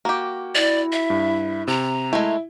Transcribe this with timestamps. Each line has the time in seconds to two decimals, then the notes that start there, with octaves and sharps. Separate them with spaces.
0.05 A#3 F#4 G4
0.55 E4 D5
0.92 E5
1.10 G2
1.67 C3 A#5
2.13 G#3 A3 E4 E5